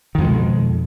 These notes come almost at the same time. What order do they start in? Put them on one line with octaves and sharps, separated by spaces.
D#3 F2 G#3 B2